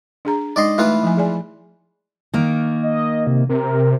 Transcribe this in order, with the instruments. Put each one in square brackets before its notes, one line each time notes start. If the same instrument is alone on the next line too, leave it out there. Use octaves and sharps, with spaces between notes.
[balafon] D4 G#4 A#5
[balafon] G#3 D#4 [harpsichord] D5 D#5 C6
[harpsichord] E3 F4 B4 [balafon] A3 E4
[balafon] F3 G#5
G#4 D5 G#5
[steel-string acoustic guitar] D#3 A#3
[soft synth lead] D#5
C3
[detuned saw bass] C3 [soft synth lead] A#4